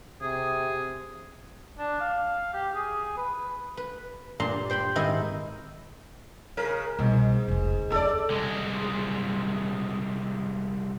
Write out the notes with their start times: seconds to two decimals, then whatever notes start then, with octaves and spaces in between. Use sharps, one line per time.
0.21 C3 G#4
1.79 D4
2.00 F5
2.53 G4
2.75 G#4
3.17 B4
3.77 B4
4.40 G2 A#2 D5 A5 A#5 C6
4.70 C5 G5 B5 C6
4.96 G#2 D#3 C4 E4 D#5 G#5
6.57 C#3 A#4
6.99 C2 G#2 B2
7.48 F1 C#2
7.92 F2 C#4 A4 D5
8.30 C2 G#3